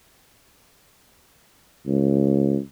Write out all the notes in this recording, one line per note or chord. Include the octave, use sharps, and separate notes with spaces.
C#2